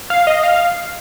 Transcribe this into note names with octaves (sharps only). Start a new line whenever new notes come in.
F5
D#5
F5